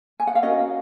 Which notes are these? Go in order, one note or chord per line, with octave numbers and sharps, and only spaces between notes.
G#5
F#5
F5
C#4 F#4 A#4 D#5
F5